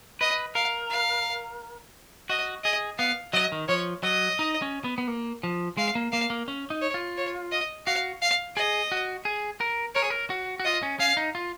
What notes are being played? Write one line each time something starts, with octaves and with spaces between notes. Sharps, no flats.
B4 D#5
A#4 F5
F5
F#4 D#5
G#4 D#5
B3 F5
F#3 D#5
D#3
F3 C#5
F#3 D#5
D#4
C#4
B3
B3
A#3
F3
G#3 F5
A#3
A#3 F5
A#3
C#4
D#4
C#5
F4
C#5
D#5
F#4 F5
F5
G#4 D#5
F#4
G#4
A#4
A#4 C#5
G#4
A#4
F#4
F#4
F4 D#5
C#4
C#4 F5
D#4
F4